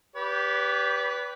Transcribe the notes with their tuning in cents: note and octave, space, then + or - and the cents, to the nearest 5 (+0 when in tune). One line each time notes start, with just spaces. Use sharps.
G4 +0 B4 +0 D5 -40